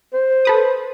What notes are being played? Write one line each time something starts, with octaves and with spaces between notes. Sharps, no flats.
C5
A4 B4 D#6